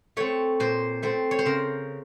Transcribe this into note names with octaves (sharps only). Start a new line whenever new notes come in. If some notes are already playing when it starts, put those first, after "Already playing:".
A3 C4 C#5
A#2 C5
A3 C4 C5
C#5
C5
C#3 A#4